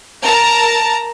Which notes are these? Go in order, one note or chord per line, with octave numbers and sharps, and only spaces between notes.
A#4 A5 A#5